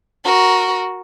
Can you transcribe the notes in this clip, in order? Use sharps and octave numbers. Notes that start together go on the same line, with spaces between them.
F#4 A#4